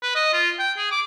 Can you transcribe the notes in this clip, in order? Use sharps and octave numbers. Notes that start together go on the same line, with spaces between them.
B4
D#5
F4
G5
G#4
D6